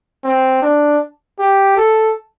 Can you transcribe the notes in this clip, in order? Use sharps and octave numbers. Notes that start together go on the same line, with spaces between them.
C4
D4
G4
A4